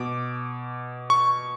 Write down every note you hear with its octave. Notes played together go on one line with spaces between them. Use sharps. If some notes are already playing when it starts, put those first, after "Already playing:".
Already playing: B2 D6
C#6